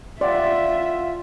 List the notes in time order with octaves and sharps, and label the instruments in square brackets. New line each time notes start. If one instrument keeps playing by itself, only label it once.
[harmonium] F4 [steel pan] D5 [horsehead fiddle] E5 [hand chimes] F#5 G5 C6